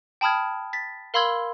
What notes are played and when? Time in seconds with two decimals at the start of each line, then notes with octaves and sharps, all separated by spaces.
0.21 G5 A5 B5 D#6 F6 G#6
0.73 A6 B6
1.14 A#4 F5 B5 C6 E6 G#6